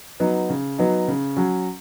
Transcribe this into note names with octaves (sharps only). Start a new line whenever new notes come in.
F#3 B3 D#4
C#3
F#3 B3 D#4
C#3
F#3 C#4